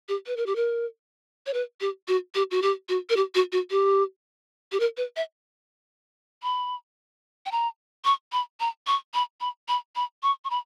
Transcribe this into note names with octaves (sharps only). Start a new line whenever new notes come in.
G4
B4
A#4
G4
A#4
C#5
B4
G4
F#4
G4
F#4
G4
F#4
A#4
G4
F#4
F#4
G4
G4
A#4
B4
E5
B5
G5
A#5
C#6
B5
A#5
C#6
B5
B5
B5
B5
C#6
C#6
B5